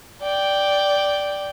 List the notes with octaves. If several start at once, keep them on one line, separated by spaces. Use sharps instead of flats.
D5 G5